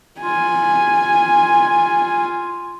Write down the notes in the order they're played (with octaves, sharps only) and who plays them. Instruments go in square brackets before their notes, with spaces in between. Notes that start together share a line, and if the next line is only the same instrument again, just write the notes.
[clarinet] F4 [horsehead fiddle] G#5